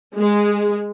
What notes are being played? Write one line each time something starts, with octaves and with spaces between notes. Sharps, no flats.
G#3